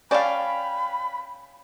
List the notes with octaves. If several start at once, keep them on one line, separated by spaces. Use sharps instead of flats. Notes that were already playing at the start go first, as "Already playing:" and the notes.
C#4 D5 F5 G5 A5 B5